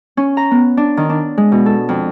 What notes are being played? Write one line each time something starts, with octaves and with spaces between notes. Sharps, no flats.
C#4
A#5
B3
D4
D#3
D4
G#3
B2
A4
F2